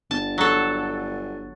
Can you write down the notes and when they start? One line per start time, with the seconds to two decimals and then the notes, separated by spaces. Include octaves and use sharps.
0.11 G1 A5
0.38 F#3 A4